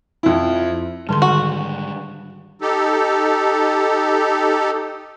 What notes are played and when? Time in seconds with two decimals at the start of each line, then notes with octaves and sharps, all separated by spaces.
0.23 F2 E4
1.09 G#2 D3 D#3 G3 C6
1.22 F#4
2.61 D#4 G4 A4